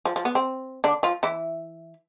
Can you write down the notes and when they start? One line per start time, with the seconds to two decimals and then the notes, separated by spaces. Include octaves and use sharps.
0.05 F3
0.16 F3
0.25 B3
0.35 C4
0.84 D3 D4
1.03 F3 F4
1.23 E3 E4